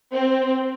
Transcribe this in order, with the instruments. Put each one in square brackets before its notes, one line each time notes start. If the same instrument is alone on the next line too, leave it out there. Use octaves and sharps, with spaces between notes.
[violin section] C4